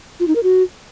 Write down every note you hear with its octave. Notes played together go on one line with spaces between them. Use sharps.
F4
D#4
A#4
F#4